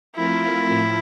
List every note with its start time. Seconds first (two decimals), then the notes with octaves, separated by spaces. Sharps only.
0.15 F3 A3 C4 E4 F4 A#4
0.69 A2 F3